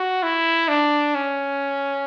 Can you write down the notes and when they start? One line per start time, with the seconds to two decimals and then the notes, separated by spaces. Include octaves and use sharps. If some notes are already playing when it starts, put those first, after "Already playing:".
Already playing: F#4
0.23 E4
0.68 D4
1.15 C#4